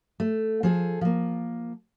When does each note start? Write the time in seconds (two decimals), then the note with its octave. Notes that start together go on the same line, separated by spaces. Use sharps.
0.20 A3
0.63 F3 G#4 A4
1.01 F3 A#3